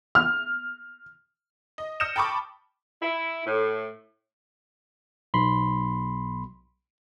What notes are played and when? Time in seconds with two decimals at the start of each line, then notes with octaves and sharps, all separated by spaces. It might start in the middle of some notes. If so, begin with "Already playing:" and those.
0.15 F6
1.78 D#5
2.00 D#6 F6 G6 A#6 C#7 E7
2.16 G5 A5 B5 C#6 D6
3.02 E4
3.45 A2
5.34 B1 B5 C6